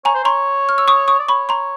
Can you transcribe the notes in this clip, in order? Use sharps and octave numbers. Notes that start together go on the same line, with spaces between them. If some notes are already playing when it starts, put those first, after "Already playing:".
C#5 G#5 A#5
C5
C#5 A#5 C6
F6
E6
C#6 D#6
C#6 D#6
D5
C#5 B5 C#6
A#5 C6